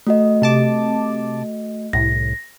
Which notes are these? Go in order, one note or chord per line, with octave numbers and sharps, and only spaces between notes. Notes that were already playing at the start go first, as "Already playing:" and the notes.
A3 F#4 D#5
C3 A5 D6
C2 A2 A#6